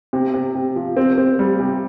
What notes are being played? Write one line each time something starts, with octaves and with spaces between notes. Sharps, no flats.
C3
C3
C3
F3
C4
C4
G3
C3